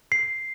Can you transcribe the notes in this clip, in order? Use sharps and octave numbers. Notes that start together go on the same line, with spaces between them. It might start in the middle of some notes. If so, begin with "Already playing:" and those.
C7